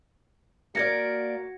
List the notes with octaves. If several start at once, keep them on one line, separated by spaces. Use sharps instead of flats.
A#3 F#4 A#4 D5 G#6 A#6 C#7